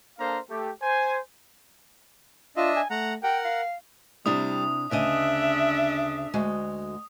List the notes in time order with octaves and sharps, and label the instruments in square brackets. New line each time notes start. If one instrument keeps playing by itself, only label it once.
[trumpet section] A#3 D4 A4 C5 F5 A#5
A3 G4
C5 G#5
[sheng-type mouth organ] D4 D#5 E5 [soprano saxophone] F4
[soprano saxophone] G#5
[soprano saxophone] A3 [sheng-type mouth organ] F#5 A#5
[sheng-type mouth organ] A#4 F#5 [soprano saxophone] G5
[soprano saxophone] F5
[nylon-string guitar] C3 D4 E4 [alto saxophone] G3 [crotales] D#6
[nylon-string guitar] D2 C#3 D#5 [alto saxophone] D4 [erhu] E5
[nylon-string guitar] D2 G#3 F#4